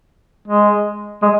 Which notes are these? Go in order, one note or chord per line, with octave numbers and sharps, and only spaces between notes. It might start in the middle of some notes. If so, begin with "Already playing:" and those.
G#3
G#3